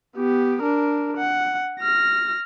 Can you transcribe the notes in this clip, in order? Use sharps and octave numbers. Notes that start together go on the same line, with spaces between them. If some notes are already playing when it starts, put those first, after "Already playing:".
B3 G4
D4 A#4
F#5
F6 A#6